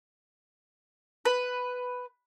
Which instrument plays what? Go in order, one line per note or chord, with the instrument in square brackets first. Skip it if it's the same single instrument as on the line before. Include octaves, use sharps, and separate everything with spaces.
[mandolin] B4